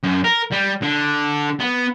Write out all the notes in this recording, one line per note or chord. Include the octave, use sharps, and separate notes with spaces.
F#2
A#4
G3
D3
B3